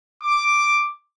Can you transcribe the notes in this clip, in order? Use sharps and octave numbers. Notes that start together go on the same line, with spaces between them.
D6